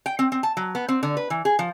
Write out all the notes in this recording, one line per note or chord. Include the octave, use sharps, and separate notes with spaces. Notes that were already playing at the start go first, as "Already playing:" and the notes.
G5
C4
C4
A5
F#3
B3
C4
D3
B4
E3
G#4
F3